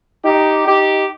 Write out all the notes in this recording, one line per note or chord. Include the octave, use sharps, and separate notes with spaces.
D#4 G4
D#4 G4